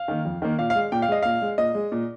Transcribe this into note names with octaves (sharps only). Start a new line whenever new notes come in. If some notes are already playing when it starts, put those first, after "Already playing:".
Already playing: F5
D#3 A#3
F2
D#3 A#3
A#2 F5
F5
G#3
A#2 G5
F5
G#3 D#5
A#2 F5
G#3
A#2 D#5
G#3
A#2